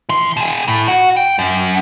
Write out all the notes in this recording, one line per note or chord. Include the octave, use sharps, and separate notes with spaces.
E3 C6
B2 G#4
A2
F#4
G5
F#2